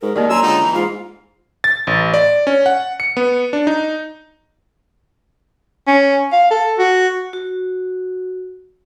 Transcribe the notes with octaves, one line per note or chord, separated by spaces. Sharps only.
G#2 A#4
D#3 A#3 G4 D5 D#5
F#2 G#5 A#5 C6 E6
C#2 D3 D#4 G5
E3
G#2 F4
A6
A1
D5
C#4
F#5
C#7
B3
D4
D#4
C#4
F5
A4
F#4
F#4